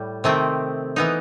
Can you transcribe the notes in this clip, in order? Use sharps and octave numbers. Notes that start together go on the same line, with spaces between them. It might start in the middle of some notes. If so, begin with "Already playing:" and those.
Already playing: A2 G3
C3 D#3 A3 C4
E3 B3 D#4